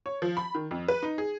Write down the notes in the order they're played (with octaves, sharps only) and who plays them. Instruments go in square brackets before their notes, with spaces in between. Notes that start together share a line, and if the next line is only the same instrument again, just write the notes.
[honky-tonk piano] C#5
F3
B5
D#3
F2
B4
D#4
G#4